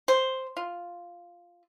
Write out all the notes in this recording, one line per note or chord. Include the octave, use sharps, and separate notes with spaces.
C5
F4